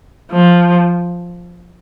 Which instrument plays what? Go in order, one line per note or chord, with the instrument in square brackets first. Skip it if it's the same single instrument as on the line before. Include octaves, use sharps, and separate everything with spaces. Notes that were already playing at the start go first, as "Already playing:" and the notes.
[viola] F3